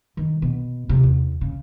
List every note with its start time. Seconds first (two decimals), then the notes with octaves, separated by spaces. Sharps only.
0.17 D#3
0.42 B2
0.89 C3
1.03 E2
1.41 C#3